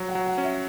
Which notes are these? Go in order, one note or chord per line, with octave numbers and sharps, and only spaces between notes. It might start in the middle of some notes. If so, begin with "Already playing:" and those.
Already playing: F#3
F#5
F#3
F#5
C#4
E5